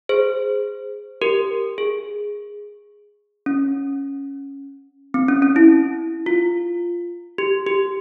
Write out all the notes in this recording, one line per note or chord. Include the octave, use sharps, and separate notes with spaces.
G#4 C5
G4 A#4
G#4
C#4
C4
C#4
C#4
E4
F4
G4
G4